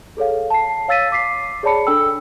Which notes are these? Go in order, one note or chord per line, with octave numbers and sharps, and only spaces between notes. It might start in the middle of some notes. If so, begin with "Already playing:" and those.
G#4 A4 C#5 F5
A5 C7
C#5 F5 E6 A6 B6 D#7
D6 B6 C7
G#4 C#5 D5 A5 B5 C#7
D4 A4 G5 E6